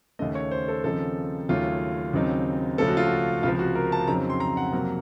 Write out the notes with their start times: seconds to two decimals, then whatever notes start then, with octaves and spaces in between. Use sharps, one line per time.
0.19 D#2 C#3 A3 D#5
0.35 C#5
0.51 C5
0.68 A4
0.84 D#2 C#3 F3 C4 D#4 A4
1.49 D#2 C#3 F#3 A3 C#4 F4
2.13 D#2 C#3 F#3 C4 D#4
2.78 C#2 C#3 F3 A3 C#4 A4
2.88 F#4
2.97 F4
3.06 F#4
3.43 C#2 C3 F3 F4
3.59 F#4
3.75 A#4
3.92 A5
4.07 F2 C#3 F#3 C4 D#4 A#5
4.30 C6
4.40 A#5
4.57 F#5
4.73 F2 C3 F#3 A#3